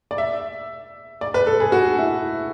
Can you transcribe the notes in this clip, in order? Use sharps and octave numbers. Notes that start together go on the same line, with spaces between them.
D5
E5
D5
B4
A4
G#4
F#4
E4